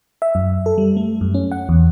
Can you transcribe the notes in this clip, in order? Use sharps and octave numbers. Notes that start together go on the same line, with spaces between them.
E5
F#2
A4
G3
A3
F#2
C#4
F#5
E2